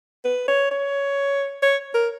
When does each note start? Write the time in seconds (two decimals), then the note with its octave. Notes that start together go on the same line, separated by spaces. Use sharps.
0.25 B4
0.48 C#5
0.71 C#5
1.62 C#5
1.94 A#4